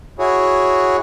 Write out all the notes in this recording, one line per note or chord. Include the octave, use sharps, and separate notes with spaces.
E4 F#4 G#4 C#5